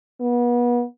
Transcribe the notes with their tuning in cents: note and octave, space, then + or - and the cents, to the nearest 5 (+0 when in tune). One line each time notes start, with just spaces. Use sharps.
B3 -35